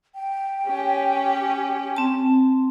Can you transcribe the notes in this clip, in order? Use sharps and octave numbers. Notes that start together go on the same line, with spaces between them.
G5
C#4 G4
C4 A5